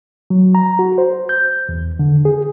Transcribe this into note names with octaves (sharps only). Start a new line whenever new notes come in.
F#3
A#5
F#4
C5
G6
E2
D3
G#4